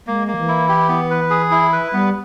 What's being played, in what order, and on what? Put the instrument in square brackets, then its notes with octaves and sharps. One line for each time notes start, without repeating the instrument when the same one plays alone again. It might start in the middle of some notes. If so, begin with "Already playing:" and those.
[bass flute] G#3 [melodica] A#3
[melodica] A#3
[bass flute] E3
[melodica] E4
G4
B3
B4
G#4
E4
B4
[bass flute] G3 [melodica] B3